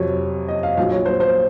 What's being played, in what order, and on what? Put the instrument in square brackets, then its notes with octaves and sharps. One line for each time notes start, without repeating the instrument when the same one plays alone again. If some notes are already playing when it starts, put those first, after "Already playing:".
Already playing: [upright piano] F2 C3 F#3 C#5
D#5
F5
A#1 A#2 F#3 F5
C#5
C5
C5